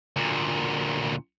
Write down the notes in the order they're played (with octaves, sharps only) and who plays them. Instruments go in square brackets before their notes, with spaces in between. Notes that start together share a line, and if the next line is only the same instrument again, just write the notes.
[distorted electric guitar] D2 A#2